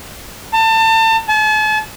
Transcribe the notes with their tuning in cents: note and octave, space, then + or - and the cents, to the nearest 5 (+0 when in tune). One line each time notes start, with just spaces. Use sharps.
A5 +30
A5 -40